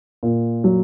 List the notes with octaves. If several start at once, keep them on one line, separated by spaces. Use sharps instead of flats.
A#2
F#3